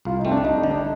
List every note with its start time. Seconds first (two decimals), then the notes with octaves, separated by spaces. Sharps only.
0.05 C2 F4
0.19 D#4
0.25 A3 C4
0.32 D4
0.44 G3 D#4
0.58 D#4
0.63 D3
0.71 D4